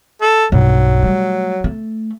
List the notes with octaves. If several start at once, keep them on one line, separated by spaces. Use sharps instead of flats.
A4
B1 G2 F#3
G3 A3
A3